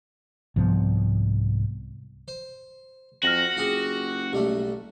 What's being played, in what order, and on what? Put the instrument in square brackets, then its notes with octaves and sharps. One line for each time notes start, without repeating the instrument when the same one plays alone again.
[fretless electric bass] C2 G#2 F3 B3
[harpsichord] C5
[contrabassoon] F2 [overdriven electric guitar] F#4 [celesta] F6 A#6 F#7
[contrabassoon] F#1 [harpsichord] F4 G4 G#4
[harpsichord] B1 G3 A3 [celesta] G4